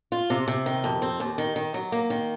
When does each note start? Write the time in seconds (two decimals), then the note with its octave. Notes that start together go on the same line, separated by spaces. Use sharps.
0.12 F4
0.30 C3
0.48 C3
0.66 D#3
0.84 F2
1.02 C4
1.20 D#2
1.38 D#3
1.56 D#3
1.74 F#3
1.92 A#3
2.10 D#3